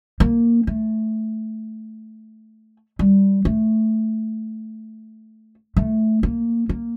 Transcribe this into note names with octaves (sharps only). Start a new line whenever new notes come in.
A#3
A3
G3
A3
A3
A#3
A#3